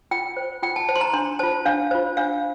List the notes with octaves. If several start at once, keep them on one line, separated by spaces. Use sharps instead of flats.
F4 G5
C5
F4 G5
A5
C5 A5
C6
A#5
D4 C6
F4 C5 A5
D4 F5
F4 C5
D4 F5